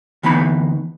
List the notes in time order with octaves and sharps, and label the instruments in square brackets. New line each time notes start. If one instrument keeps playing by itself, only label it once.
[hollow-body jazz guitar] D2 E3 B3 D#4 B5